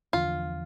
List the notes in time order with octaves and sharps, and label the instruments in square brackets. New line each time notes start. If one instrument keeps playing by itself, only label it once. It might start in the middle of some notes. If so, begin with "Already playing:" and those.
[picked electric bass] E2 D3 F3 [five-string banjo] F4